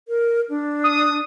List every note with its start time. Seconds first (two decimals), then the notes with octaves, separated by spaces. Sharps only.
0.08 A#4
0.49 D4
0.84 D#6